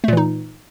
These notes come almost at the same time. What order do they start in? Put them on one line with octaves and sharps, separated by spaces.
A3 A#2 E3 D#4